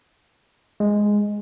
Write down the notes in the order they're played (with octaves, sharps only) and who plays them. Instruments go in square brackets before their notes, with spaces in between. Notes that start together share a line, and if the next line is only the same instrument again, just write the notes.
[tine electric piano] G#3